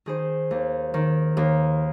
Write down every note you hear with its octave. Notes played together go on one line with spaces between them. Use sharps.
D#3 G#4 C5
D#2
D#3
D#2